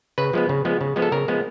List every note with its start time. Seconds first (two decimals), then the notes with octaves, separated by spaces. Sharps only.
0.18 C#3 B4
0.33 F3 G#3 B3
0.49 C#3
0.65 F3 G#3 B3
0.81 C#3
0.96 F3 G#3 B3
1.02 A4
1.12 C#3 A#4
1.28 F3 G#3 B3